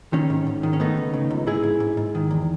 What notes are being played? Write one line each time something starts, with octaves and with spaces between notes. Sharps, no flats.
D#3 C#4
G#2
G#2
D#3
C#4
A3 B3 D#4
C#2
C#3
C#2
G#2 E4 G#4
G#2
G#2
G#2
D#3
E2